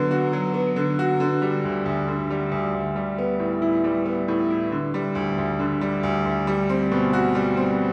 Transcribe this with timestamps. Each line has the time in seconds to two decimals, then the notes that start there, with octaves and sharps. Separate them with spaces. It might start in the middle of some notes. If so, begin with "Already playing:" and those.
Already playing: D3 F#3 B3
0.11 F#4
0.33 F#3
0.54 B3
0.76 D3
0.99 F#4
1.20 D3
1.42 G3
1.64 D2
1.86 D2
2.08 D3
2.30 G3
2.52 D2
2.74 D2
2.96 G3
3.18 B3
3.40 A2
3.62 E4
3.84 G3
4.06 B3
4.28 A2
4.50 E4
4.72 D3
4.94 G3
5.15 D2
5.38 D2
5.59 D3
5.81 G3
6.03 D2
6.25 D2
6.47 G3
6.69 C4
6.91 B2
7.13 F#4
7.35 G3
7.57 C4